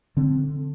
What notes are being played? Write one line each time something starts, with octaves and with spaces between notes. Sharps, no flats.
D3 C4